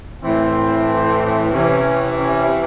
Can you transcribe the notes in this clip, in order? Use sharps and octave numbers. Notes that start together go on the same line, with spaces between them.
A2 E3 C4
C3 E3 C#4
C#4